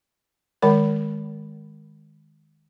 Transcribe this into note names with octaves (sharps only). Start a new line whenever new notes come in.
D#3 G#3 A#4 B5